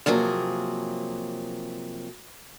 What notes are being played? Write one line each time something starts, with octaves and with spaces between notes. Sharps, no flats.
C3 F3 F#3 A#3 G#4